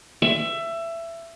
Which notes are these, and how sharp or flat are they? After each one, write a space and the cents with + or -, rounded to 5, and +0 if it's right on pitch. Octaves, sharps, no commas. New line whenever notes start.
E5 +20